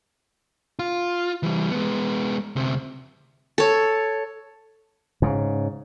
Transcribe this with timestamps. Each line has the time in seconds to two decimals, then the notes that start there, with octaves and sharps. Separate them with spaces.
0.79 F4
1.43 E3 G3
1.70 G#3 B3
2.56 D2 C3
3.58 A4 C#5
5.22 G#2 C#3